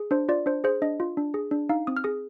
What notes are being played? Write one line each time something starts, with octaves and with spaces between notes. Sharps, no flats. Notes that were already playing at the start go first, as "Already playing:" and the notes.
Already playing: G#4
D4 C5
F4 D5
D4 C5
G#4 C5
D4 D#5
F4
D4
G#4
D4
D#4 F5
C4 D#6
F6
G#4 D#6